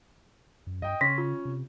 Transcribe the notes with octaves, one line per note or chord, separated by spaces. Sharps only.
F#2
G2 D#5 G5
C#3 C#4 C6 A#6 B6
F4
C3